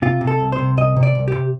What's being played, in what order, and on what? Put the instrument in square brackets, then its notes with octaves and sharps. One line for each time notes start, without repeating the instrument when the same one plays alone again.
[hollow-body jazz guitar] C3 F4
C3
A4
C2
C5
C3
C2 D#5
C3
D5
C2
G4
C3